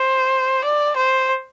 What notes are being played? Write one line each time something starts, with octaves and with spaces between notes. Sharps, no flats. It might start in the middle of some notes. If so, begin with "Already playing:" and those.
Already playing: C5
D5
C5